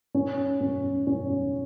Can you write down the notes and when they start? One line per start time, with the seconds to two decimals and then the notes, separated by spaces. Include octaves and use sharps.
0.15 C#4
0.61 C#4
1.07 C#4